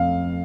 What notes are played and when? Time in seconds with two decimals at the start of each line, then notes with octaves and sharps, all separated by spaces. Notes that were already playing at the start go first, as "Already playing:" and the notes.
Already playing: F2 A3 F5